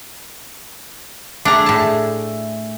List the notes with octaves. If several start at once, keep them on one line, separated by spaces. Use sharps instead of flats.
A3 D4 G#4 A#5
A2 A5